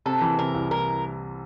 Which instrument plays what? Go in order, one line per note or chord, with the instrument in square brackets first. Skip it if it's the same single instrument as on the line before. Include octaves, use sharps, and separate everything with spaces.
[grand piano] C3 [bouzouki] A4
[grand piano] E3
[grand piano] C3 [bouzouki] A#4
[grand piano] C2
[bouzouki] A#4